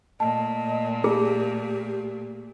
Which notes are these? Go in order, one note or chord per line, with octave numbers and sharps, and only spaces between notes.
A#2 A3 D#5 A5
G4 G#4